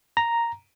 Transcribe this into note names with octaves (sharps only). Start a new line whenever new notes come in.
A#5